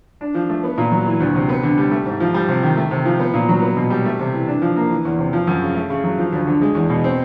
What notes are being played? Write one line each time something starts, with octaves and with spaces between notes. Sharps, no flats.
D4
F3
A3
B3
A#2
F#3
E3
D2
C3
B3
D3
G3
A3
G#2
F3
G3
C3
D#3
A3
C3
F3
B3
A#2
F#3
B3
B2
G3
A3
C3
E3
D4
F3
A#3
E3
E2
C3
F3
F#2
C#3
A3
C#3
F#3
F3
D2
D3
G#3
E2
B2
C4